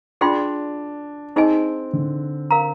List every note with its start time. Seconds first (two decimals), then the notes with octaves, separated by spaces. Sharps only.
0.21 D4 F4 G#4 D5 G5 C6
1.36 C4 D#4 G#4 D#5 G#5
1.93 D3
2.51 A#4 F5 A#5